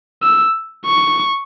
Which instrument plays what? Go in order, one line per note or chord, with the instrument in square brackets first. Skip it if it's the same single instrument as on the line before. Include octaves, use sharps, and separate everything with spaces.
[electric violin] E6
C#6